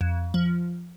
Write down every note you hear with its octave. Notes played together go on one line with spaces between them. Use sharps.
F2
F3